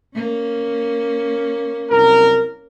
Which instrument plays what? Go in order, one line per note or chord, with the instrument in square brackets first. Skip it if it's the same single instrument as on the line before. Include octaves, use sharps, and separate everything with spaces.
[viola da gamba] A#3 C#4
[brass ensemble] C2 F#2 A#4